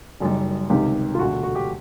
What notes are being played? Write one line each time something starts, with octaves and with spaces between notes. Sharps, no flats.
F#1 F#2 D#3 G3
C#2 C3 D#3 G4
F4
E1 D2 D3 F#4
F#4
G4